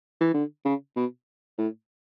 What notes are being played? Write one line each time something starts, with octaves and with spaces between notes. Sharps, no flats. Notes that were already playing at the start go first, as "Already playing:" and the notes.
E3
D3
C#3
B2
A2